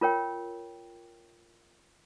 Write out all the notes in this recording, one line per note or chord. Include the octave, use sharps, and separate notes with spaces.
F4 A#4 C#5 G5